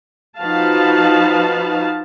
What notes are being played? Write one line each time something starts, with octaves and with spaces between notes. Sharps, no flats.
F3 D#4 F#4 B4 F5 A5